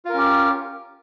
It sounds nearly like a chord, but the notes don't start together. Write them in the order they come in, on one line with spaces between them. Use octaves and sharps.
F4 A#4 C#4 G4